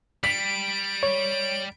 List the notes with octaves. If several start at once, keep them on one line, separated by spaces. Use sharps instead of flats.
G3 B6 D7
C#5